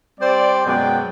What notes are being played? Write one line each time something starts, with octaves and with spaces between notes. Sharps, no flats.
G3 C4 C5 D5
F#2 B2 G#3 D5 G5